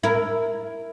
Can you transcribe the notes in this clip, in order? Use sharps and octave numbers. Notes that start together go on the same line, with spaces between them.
E4 A#4